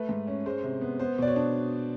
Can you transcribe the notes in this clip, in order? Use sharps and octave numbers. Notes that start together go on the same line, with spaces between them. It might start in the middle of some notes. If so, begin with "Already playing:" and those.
Already playing: A3 B4
G#2
C#4
G#3 C5
C3
B3
B3 C5
B2 D5
C#5
D4